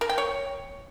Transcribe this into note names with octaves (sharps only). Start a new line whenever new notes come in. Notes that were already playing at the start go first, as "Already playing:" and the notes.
A#4
G5
C#5